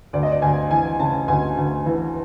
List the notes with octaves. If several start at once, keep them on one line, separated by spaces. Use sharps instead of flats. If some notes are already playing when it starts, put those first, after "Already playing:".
D2 D5
D#5
D5
D2 G#5
E3 G#5
C#3 A5
D2 G#5
D2
E3